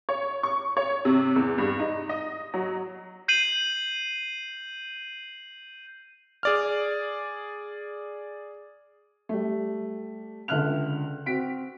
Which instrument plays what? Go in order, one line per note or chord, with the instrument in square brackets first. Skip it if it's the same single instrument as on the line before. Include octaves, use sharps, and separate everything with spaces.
[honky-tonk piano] C#5
C#6
C#5
C3
E2
G2
D#4
D#5
F#3
[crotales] G6 C7 D#7 F#7
[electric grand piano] G#4 D5 F6
[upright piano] G3 A3
C#2 D3 E5 F6 F#6 F7
C4 F#4 B6 D7